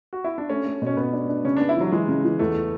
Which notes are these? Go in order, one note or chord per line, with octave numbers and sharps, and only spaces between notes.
F#4
E4
D4
A3 C#4
A3
B2 C#4
B2 B3
D4
D4
C#3 C#4
B3 D4
E4
E3 F#3
E3 G#3
C#3
E3
E2 A3